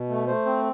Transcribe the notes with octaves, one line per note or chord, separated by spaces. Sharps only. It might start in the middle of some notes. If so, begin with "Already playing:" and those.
Already playing: B2
A3
A3 C5
C4